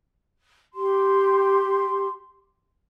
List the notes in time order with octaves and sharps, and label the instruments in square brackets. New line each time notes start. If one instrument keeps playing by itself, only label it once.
[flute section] G4 C6